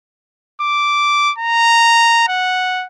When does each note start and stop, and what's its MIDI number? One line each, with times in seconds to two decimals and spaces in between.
0.61 1.33 86
1.38 2.25 82
2.28 2.87 78